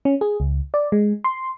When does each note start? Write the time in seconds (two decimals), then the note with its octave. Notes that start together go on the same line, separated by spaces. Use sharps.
0.05 C#4
0.21 G#4
0.40 C#2
0.74 D5
0.92 G#3
1.24 C6